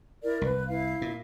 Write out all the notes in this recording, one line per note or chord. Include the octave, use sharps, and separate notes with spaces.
E4 A#4 D5
C2 B4
E4 F5
A#2